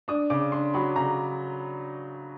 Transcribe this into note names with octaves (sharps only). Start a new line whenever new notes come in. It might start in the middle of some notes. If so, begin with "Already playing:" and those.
D4 D#6
C#3 D6
D4 C6
F#3 B5
C#3 A#5